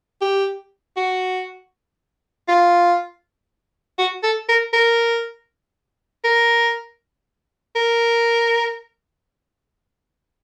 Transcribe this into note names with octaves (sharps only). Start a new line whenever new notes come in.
G4
F#4
F4
F#4
A4
A#4
A#4
A#4
A#4